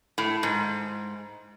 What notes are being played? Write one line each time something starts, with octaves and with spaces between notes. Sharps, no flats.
A2
G#2